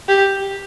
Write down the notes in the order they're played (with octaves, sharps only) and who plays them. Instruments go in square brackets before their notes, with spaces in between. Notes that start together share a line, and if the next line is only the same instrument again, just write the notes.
[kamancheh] G4